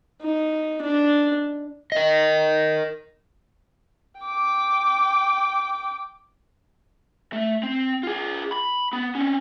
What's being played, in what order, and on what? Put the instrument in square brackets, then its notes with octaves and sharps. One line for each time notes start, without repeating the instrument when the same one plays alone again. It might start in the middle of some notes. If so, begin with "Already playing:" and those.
[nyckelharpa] D#4
D4
[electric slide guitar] A#4 D#5
[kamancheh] G5 D6
[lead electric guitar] A3
C4
F4 G#4
B5
B3
C4 C#4